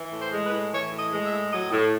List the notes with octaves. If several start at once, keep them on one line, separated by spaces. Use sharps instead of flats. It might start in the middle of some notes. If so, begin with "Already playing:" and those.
Already playing: E3
A2
C5
G#3
B4
A2
E3 C#5
A2
D#5
G#3
E5
A2
F#3 D#5
A2